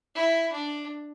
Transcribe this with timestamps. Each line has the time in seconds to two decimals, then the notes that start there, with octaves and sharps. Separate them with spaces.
0.15 E4
0.52 D4